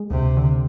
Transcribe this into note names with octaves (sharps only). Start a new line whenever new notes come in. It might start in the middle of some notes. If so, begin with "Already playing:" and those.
Already playing: G#3
D2 C3
D3